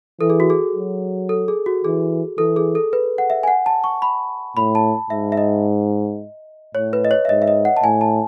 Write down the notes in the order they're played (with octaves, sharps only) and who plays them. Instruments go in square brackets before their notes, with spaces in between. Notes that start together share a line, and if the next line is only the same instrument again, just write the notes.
[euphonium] E3 [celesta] A4
[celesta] G#4
F#4
G#4
[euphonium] F#3
[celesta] A4
G#4
F#4
[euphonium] E3 [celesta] G#4
[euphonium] E3 [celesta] A4
[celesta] G#4
A4
B4
F#5
E5
G#5
F#5
A5
C#6
B5
[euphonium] A2 [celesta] B5
[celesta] A5
[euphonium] G#2 [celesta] E5
[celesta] E5
D#5
[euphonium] A2 [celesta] C#5
[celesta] B4
D#5
C#5
E5
[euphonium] G#2 [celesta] D#5
[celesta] E5
D#5
F#5
A5
[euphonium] A2 [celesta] G#5
[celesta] A5